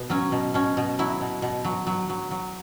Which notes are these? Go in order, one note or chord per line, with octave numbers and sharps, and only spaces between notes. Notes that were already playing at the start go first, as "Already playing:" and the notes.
Already playing: B2 B3
F#3 C#4
B2
B2 C#4
B2
F#3 E4
B2
B2
F#3
F#3
F#3
F#3